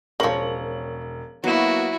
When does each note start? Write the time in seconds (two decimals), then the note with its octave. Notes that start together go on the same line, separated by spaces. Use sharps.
0.20 E1 C#3 F3 A#4 C#5 F#7
1.44 F#3 A#3 B3 E4 F#4